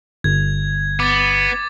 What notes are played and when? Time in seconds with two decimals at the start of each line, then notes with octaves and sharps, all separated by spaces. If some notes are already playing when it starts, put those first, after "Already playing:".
0.24 G1 G#6
1.00 B3 D6 A6